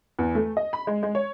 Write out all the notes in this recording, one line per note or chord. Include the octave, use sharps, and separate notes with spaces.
E2
A3
D#5
B5
G#3
G#3
C#5